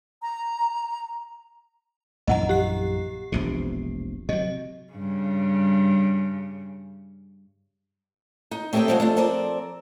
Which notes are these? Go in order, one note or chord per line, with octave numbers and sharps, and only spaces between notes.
A#5
A#1 F#2 E3 D#5 F#5 A#5
G4 C7
E1 A#1 C3
C3 F#3 D#5
G2 C#3
D#4
A3 C4 G4 G#4 E5 G5
B2 E3 F3 G#3 C4
A3 D4 F4
F3 C4 A4 A#4 D5